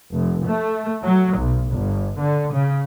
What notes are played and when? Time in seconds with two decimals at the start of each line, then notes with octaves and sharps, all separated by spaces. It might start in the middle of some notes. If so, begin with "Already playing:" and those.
0.12 F1
0.43 A3
1.04 F#3
1.37 B1
1.68 G1
2.19 D3
2.52 C#3